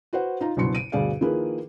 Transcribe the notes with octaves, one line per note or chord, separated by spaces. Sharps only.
F#4 B4 C5 F#5
D#4 F4 A#5
F#1 C2 G2 B2 C6 C#7
D7 D#7
D2 G2 B2 G#4 D5 F5
D#3 F3 A#3 E4 G#4 B4